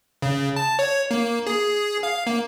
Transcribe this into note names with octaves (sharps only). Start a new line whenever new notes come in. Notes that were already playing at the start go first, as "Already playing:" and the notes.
C#3
A5
C#5
A#3
G#4
F5
A#3